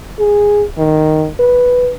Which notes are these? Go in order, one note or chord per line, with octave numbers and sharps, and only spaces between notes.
G#4
D#3
B4